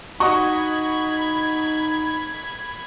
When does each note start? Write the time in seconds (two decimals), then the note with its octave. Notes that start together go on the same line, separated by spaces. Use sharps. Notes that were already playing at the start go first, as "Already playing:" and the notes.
0.20 D#4 F#4 D#5 F#5 B5 C#6 G#6